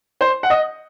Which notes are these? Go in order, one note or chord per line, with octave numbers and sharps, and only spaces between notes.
C5
F#5
D#5